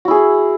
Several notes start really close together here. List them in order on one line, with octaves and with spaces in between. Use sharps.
F#4 E4 G#4